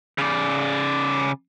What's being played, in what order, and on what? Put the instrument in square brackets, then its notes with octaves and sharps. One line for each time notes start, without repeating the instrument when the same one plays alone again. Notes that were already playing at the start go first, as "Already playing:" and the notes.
[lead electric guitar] C#3 D5